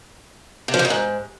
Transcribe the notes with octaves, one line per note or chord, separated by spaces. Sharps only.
C3
F3
C3
F2
G#2